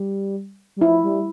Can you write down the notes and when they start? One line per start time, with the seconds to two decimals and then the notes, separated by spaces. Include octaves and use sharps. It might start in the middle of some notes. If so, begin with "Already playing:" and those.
Already playing: G3
0.77 G3
0.81 F3 E4
1.04 G3